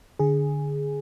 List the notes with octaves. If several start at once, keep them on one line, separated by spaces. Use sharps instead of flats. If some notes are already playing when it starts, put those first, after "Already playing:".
D3 G#4